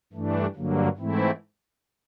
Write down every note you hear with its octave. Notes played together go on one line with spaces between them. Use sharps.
G2 E3 A3 D4
G2 D3 F#3 A#3
G#2 E3 A3 C4 E4